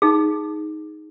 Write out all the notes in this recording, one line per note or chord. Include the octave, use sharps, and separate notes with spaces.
D#4 G#4